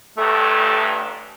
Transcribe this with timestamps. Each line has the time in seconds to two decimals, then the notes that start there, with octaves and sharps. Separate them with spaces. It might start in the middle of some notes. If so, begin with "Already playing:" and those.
0.17 A1 G2 A3